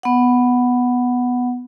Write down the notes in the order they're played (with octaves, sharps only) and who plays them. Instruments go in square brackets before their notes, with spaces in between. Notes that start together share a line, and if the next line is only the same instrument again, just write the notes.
[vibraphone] B3 F#5